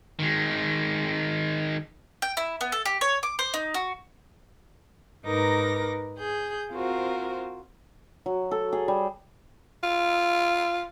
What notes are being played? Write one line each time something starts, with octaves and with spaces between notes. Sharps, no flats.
D#3 G#3
G5
E4
B3
A4
G4
C#5
D6
C5
D#4
F#4
G#2 D#4 A#4 B4 D6 A#6
G#4 G6
C4 F4 F#4 A#4 C5
F#3
A4
G#4
G3
F4